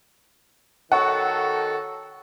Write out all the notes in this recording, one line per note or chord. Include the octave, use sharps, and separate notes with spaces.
D#3 F#4 A4 C#5 F#5 C#6